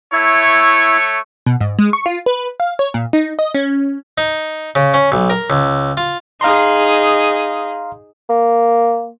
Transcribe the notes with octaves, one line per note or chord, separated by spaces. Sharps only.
A3 E4 C#5 C#6
B2
G#2
G#3
C#6
F4
B4
F5
C#5
A#2
D#4
D#5
C#4
D#4
C#3
C#4
B1
A#4
C#2
F4
D#4 G#4 F5 A#5 C6
A#3